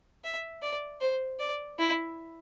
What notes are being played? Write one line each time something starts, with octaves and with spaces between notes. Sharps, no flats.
E5
D5
C5
D5
E4